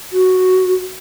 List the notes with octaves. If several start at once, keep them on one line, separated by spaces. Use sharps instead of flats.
F#4